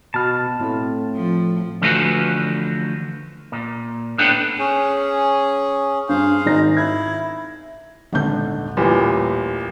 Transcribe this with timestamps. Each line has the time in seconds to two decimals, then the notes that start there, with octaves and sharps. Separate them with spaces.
0.14 B2 A5 B5 F6
0.60 A2 C4 A4
1.15 F3
1.82 D3 E3 F3 A3 F#4 B4
3.52 A#2
4.18 A2 B3 D4 A4 G5
4.59 C#4 G#4
6.09 G2 G#4 C5 F5
6.45 G#1 D#4 A#6
6.77 E4 G#6
8.13 D#1 G#1 D3 G6
8.77 A1 A#2 G3 B4